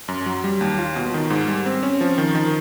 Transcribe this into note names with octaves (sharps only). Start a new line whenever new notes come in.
F#2
F#3
G3
D#2
F4
B2
D#3
G#2
G3
C4
C#4
F3
D#3
D#3